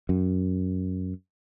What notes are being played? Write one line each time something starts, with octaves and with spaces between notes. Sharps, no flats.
F#2